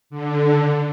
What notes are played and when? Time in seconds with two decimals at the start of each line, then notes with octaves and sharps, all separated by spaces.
0.10 D3